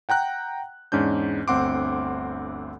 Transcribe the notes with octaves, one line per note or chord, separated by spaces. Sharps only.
F#5 G5 A#5 F#6
E2 G#2 C#4 D4 G6
G1 D2 C4 F#5 C6 D6